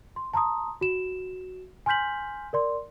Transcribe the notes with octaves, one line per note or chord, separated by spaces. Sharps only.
C6
A5 A#5 C6 D#6
F#4 E7
G#5 C6 F6 G6 B6 F#7
A#4 D5 C6